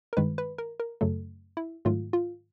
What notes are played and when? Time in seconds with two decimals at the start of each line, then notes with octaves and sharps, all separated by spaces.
0.13 A#4
0.17 G2 D#3 G#3 B4
0.38 B4
0.58 A#4
0.80 A#4
1.01 F#2 C#3 F#3 A3 A4
1.57 E4
1.85 G#2 D#3 F#3 A3 F4
2.13 F4